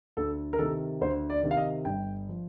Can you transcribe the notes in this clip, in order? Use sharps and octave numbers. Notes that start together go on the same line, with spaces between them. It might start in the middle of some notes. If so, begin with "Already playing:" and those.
D2 A4
A#4
C3 D#3 A4
D2 C5
D5
C3 D#3
F5
D#5
G1 G5
F3